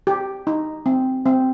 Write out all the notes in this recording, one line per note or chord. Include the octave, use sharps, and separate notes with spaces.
G4
D#4
C4
C4